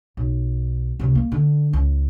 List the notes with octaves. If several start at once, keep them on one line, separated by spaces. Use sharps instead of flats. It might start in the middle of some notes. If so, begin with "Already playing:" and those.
B1
C#2 C3
A#3
D3
C#2